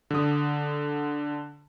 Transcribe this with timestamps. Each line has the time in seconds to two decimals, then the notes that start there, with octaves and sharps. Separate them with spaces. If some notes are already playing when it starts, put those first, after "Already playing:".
0.11 D3 D#6